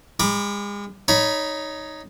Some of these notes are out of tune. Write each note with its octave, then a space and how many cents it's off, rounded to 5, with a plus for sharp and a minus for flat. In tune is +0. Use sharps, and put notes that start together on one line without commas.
G#3 -35 B5 -30 D6 +15
D#4 +0 C#5 +15 B5 +0